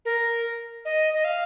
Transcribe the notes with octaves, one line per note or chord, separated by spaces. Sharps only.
A#4
D#5
D#5
F5